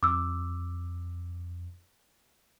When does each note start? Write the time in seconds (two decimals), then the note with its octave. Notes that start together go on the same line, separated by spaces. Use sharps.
0.03 F2 D6 E6